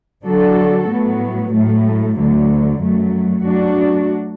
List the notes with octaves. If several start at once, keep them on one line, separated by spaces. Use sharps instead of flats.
D3 F#3 D4 F#4 A4
A2 F#3 B3
A2 F#3 A3
D2 D3 F#3
F#2 F#3 A3
F#3 A3 D4 F#4